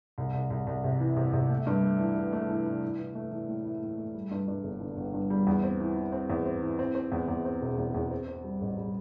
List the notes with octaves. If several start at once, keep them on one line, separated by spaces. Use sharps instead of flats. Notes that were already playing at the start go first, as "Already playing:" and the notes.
C2
C2
C2
C2
C3
E3
C3
C3
A3
G2
A3
E3
E3
A3
E3
E3
E3
E3
A3
E3
A2
E4
A2
A3
G3
G2
G2
G1
D3
G1
G2
G3
E2
C4
E3
E3
C4
E2
C4
E3
C4
C4
E2
E2
C4
E1
E2
E2
C4
C4
G3
A1
G3